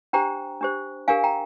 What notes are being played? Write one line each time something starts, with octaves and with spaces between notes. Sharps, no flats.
D4 G4 C5 G5 A#5
D4 G4 C5
D4 G4 A#4 F5 G#5
G5 A#5